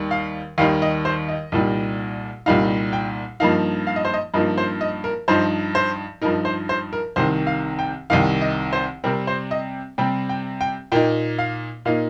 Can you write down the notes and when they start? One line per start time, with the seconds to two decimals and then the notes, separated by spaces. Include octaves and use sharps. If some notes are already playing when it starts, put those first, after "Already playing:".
Already playing: D#2 D#3 G3 D#4
0.11 F5
0.58 D#2 D#3 G3 D#4 F5
0.82 D#5
1.05 C5
1.28 D#5
1.52 C2 A#2 G3 D#4
2.46 C2 A#2 G3 D#4 F5
2.93 G5
3.40 G2 F3 A#3 D#4 F5
3.87 F5
3.96 D#5
4.05 C5
4.14 D#5
4.34 G2 F3 A#3 D#4 D#5
4.58 C5
4.81 D#5
5.04 A#4
5.28 G2 F3 D#4 C5
5.75 C5
6.22 G2 F3 D#4 A#4
6.45 C5
6.69 C5
6.93 A#4
7.16 C2 C3 D#3 C5
7.47 F5
7.79 G5
8.10 C2 C3 D#3 F5
8.41 D#5
8.73 C5
9.04 C3 G3 C4 A#4
9.27 C5
9.51 D#5
9.98 C3 G3 C4 G5
10.29 G5
10.61 G5
10.92 A#2 A#3 D#4 G5
11.38 F5
11.85 A#2 A#3 D#4 F5